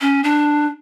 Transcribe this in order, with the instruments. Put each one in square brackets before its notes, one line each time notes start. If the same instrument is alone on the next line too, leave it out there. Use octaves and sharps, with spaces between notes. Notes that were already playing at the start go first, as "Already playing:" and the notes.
[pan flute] C#4
D4